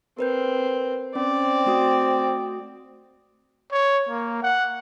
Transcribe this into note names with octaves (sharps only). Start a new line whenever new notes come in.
C4 A#4 B4 G6
C4 C#4 D5
A3 F#4 D#6
C#5
A#3
F#5